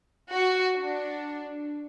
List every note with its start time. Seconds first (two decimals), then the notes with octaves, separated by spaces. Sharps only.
0.32 F#4
0.77 D4